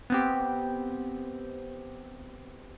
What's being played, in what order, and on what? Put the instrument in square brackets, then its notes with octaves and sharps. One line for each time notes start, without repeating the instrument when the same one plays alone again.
[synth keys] B3 C4 G4